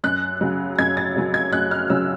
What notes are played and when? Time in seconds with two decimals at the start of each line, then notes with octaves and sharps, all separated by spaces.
0.04 F#2 F#6
0.41 C#3 F#3
0.79 F#2 G#6
0.97 A6
1.16 C#3 F#3
1.34 G#6
1.53 F#2 F#6
1.71 F6
1.90 C#3 F#3 E6